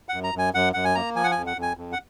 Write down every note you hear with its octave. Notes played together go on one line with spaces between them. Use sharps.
F#5
F#2
A#5
F#2 G#5
F#2 F#5
F#2 F#5
G#5
A#3 A#5
F3 G#5
F#5
F2 G#5
F#5
F2
G#5
F2
F#5